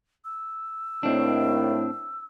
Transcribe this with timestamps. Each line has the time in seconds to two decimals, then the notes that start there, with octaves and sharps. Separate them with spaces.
0.25 E6
1.03 D#2 A2 C4 D4